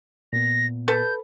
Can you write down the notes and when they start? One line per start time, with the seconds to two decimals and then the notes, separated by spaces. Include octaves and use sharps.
0.33 A#2 B3 A#6
0.88 A4 B4 G6